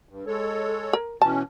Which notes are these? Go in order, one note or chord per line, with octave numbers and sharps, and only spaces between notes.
G2
G#3 A4 C#5
A#4
B2 E3 C#4 A5